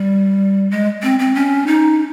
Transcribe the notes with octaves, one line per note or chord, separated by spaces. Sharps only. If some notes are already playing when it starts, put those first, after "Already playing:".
Already playing: G3
G#3
C4
C4
C#4
D#4